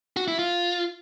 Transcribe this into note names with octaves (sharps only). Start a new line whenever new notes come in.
F#4
E4
F4